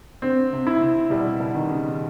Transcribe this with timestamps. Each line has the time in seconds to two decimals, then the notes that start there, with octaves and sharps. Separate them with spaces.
0.22 D3 C4
0.53 C3
0.67 E4
0.81 C3
1.10 B2 G3
1.40 B2
1.55 D#3
1.69 C#3